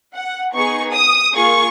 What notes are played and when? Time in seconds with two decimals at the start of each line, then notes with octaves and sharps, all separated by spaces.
0.15 F#5
0.54 B3 D#4 G#4 C#6
0.93 D#6
1.32 A#3 F4 G#4 C#6